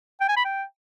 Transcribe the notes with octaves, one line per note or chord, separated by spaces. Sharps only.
G5
G#5
B5
G5